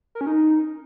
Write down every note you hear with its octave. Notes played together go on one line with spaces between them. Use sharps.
A#4
C#4
D#4